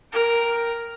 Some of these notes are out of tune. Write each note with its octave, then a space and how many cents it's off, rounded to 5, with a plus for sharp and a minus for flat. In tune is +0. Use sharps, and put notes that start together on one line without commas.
A#4 +0 G5 +0